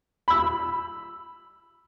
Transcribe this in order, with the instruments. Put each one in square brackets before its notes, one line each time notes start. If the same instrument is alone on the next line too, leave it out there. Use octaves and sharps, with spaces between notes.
[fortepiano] B5 E6